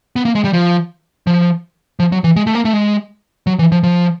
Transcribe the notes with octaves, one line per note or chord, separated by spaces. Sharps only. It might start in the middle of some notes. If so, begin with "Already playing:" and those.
B3
A#3
G#3
G3
F3
F3
F3
F#3
E3
G#3
A3
A#3
A3
G#3
F#3
E3
F3
F3